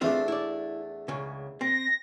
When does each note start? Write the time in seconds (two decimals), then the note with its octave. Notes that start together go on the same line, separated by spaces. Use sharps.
0.01 E2 A3 C4 D4 F4
0.28 E4 D5
1.08 C#2 C#3
1.61 C4 A#6